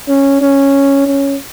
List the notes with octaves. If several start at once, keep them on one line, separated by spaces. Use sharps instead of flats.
C#4
C#4
C#4